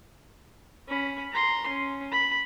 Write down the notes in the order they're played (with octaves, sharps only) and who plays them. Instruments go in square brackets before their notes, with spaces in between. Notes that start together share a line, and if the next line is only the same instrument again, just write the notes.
[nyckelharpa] C#4 B5
A#5 C6
C#4
B5